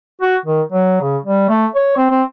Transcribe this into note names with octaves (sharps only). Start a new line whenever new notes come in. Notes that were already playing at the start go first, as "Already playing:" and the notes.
F#4
D#3
F#3
C#3
G3
A3
C#5
C4
C4